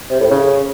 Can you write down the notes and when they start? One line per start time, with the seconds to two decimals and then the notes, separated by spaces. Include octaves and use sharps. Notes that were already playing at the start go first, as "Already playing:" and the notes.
0.10 C3
0.20 A2
0.31 C#3